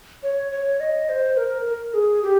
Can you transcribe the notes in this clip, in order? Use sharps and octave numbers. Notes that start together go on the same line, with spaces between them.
C#5
C#5
D#5
C5
A#4
A#4
G#4
G4